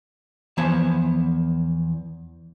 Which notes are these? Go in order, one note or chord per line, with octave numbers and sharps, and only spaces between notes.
E2 F3 B3 G#5 A5